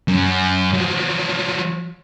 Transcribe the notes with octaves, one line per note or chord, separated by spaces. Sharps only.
F#2
F3 F#3